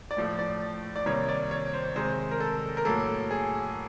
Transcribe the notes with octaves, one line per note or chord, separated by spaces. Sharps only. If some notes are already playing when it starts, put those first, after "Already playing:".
D5
A2 F3 A3
D5
D5
C3 D#3 G3 A#3 C#5
D5
C#5
C5
C3 D#3 G#3 C5
A#4
A4
A#4
A2 F#3 A#3 A4
G#4